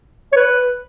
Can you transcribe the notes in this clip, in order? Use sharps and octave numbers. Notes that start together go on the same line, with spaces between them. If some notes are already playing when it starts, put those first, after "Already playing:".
C#5
B4